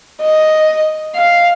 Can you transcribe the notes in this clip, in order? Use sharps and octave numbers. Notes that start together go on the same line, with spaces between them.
D#5
F5